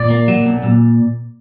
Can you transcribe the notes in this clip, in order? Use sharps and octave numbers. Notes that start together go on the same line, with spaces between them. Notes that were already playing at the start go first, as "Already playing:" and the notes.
Already playing: A#2 D5
A#3
F#3
B1
A#2